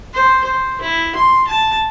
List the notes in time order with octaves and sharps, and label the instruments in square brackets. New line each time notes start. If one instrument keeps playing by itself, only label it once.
[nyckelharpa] C5
C5
E4
C6
A5